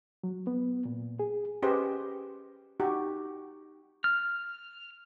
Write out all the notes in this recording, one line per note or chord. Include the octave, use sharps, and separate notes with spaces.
F#3
B3
A#2
G#4
C#4 G4 G#4 B4 C5 D#5
D#4 F#4 G4
F6